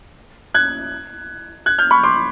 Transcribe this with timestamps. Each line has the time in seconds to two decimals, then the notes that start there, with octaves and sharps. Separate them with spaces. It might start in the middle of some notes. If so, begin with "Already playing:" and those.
0.54 F#6 G#6
1.66 F#6 G#6
1.78 F6 G6
1.91 B5 C#6
2.04 C6 D6